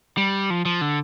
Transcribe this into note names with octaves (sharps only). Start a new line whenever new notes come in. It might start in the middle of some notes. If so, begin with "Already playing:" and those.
G3
F3
F3
D3